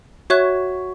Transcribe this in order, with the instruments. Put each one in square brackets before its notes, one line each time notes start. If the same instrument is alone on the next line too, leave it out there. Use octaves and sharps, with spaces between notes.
[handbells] F#4 [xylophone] C#5 E5 C#6 F#6